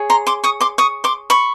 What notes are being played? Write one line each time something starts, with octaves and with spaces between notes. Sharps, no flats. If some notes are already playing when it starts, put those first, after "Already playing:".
Already playing: G#4 C#5
A#5 C6
C6 D6
C#6 D#6
C6 D6
C#6 D#6
C6 D6
B5 C#6